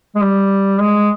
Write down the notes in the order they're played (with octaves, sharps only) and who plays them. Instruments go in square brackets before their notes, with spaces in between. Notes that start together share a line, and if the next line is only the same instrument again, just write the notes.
[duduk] G#3
G3
G#3